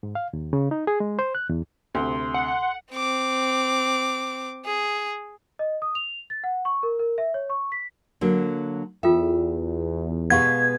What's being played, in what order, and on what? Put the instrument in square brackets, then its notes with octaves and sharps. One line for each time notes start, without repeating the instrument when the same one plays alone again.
[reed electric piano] G#2
F5
D#2
C#3
D#4
G#4
G#3
C5
F#6
E2
[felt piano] D2 C3 [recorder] C6
[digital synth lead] F#5
[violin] C4 D6
G#4
[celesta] D#5
D#6
F7
A6
F#5
C#6
A#4
A#4
E5
C#5
C#6
B6
[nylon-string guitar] D3 F#3 A#3
[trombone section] E2 [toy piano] F4 A4 G5 [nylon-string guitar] E5
[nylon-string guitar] B2 G#3 B3 [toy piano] G4 F5 F#5 [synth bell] G#6